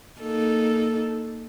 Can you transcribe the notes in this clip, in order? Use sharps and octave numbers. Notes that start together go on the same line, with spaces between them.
A#3 D#4 A4